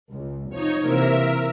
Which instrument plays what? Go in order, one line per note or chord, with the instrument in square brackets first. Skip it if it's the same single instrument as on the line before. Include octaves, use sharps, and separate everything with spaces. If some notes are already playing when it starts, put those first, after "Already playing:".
[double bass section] C#2
[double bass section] F1 F3 [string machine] D#4 C#5
[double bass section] C3 E3 A#3 [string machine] A#4 E5